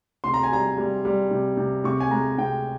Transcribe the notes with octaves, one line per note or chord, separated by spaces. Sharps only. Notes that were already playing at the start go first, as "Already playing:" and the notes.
C3 C6
A#5
G#5
G3 A#5
G3
G3
C3
C3
C3 C#6
G#5
G#3 A#5
C3 G5